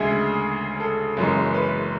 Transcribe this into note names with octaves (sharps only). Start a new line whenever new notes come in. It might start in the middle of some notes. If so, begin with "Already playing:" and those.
Already playing: D2 C#3 G#3 G#4 E5
A4
F#1 F#2 E3 G#3
B4